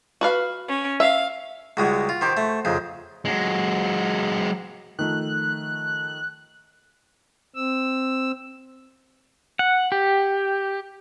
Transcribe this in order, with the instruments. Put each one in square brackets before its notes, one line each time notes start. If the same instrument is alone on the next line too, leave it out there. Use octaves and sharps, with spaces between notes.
[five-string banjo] F#4 B4 F5
[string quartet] C#4
[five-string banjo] E5 [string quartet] F5
[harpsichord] C#2 G3 G#3 [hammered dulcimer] F#4
[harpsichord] F4
[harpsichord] D#3 G4 [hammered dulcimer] C5
[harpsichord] A3
[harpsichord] F2 C#3 [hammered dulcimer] D#4
[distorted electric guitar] F#3 G#3
[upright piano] D#3 F3 A3 [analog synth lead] F#6
[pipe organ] C4 E6
[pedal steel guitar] F#5
G4